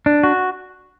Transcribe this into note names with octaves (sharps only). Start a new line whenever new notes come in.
D4
F#4